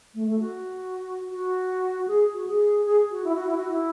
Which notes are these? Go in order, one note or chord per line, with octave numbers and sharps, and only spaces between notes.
A3
A3
F#4
F#4
G#4
F#4
G#4
G#4
F#4
E4
F#4
E4
F#4
E4